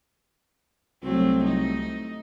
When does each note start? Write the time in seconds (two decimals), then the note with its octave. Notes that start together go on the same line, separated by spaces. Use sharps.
1.03 C2 F#3 A3 C4
1.43 D#4